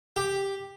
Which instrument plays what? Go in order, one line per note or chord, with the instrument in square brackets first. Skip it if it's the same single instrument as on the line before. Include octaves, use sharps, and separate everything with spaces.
[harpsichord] G4